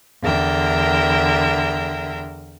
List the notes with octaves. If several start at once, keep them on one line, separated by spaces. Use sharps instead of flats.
E2 D3 A#4 E5 G5